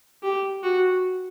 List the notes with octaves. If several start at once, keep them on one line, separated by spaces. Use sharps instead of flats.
G4
F#4